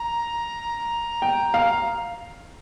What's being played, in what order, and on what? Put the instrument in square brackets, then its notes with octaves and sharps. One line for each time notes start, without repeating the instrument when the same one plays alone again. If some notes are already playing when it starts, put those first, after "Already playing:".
Already playing: [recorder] A#5
[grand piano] G5
F5